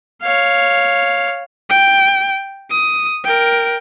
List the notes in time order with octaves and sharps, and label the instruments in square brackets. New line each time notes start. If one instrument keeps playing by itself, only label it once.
[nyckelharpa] C#5 F5
[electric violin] G5
D#6
A#4 G5